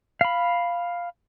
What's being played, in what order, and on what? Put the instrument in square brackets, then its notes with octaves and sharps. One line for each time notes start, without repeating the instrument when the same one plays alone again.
[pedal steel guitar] F5 B5